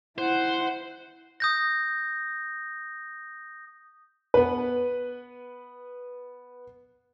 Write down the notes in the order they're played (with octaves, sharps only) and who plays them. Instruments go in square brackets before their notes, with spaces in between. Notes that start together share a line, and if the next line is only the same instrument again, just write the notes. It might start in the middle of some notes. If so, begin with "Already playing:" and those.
[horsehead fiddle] E4 F#5 [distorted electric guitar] C5
[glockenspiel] D#6 G6 A#6
[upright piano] B3 B4